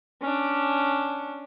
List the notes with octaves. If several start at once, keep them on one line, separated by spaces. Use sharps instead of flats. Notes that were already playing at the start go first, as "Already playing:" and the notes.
C#4 D4